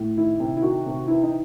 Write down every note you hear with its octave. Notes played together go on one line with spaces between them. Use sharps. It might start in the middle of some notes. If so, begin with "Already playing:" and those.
Already playing: A2
D#3 E4
C3
E4
D#3 F#4
C3
E3 E4
D#4